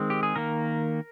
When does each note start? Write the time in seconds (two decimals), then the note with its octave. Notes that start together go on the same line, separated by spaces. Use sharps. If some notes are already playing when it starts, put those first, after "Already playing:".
Already playing: D#3 G#3 C4
0.10 G4
0.23 G#4
0.36 D#3 A#3 A#4